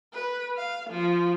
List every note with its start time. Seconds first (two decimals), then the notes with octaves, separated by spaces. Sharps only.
0.13 B4
0.57 F5
0.90 F3